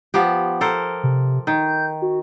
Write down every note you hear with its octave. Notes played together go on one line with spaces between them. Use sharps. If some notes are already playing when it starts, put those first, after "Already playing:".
F3 B3 G4
A4 A#4 C5
C3
D#3 G6
F#4